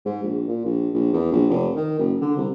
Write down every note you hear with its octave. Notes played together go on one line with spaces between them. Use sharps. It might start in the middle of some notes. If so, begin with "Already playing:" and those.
G#2
A#1
A#2
A#1
A#1
E2
A#1
F1
D#3
F#1
D3
C2